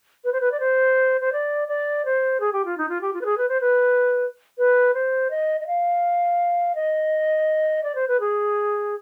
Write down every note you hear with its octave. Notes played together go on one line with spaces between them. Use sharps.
B4
C5
B4
D5
C5
C5
D5
D5
C5
G#4
G4
F4
D#4
F4
G4
F4
B4
G#4
B4
C5
B4
B4
C5
D#5
D#5
F5
D#5
D5
C5
B4
G#4